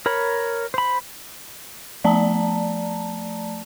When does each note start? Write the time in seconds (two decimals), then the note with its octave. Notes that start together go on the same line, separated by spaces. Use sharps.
0.06 A#4 C#5 B5
0.74 C5 B5
2.04 F3 A3 D5 A5 A#5